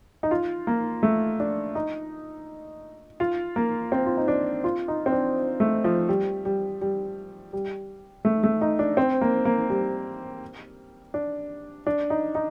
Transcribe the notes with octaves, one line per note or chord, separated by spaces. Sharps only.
D#4
F4
A#3
A3
D4
D#4
F4
A#3
C4
F4
D#4
D4
F4
D#4
C4
D4
A3
F3
G3
G3
G3
G3
A3
A3
D#4
D4
C4
A#3
A#3
G3
D4
D4
D#4
D#4